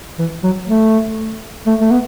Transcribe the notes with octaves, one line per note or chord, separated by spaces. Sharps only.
E3
F#3
A3
A3
A3
B3